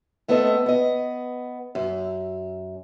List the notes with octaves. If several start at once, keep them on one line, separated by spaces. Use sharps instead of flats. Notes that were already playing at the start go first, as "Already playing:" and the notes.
A3 B3 C4 A4 C#5 D#5
B3 D#5
F#2